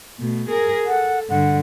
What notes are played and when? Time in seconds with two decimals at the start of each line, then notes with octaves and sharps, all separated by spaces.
0.20 B2 A3
0.49 G#4 A#4
0.86 A4 F#5
1.29 G2 D3 F#5